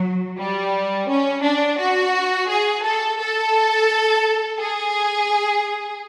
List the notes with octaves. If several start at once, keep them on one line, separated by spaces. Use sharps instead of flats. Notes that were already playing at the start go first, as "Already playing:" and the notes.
Already playing: F#3
G3
C#4
D4
F#4
G#4
A4
A4
G#4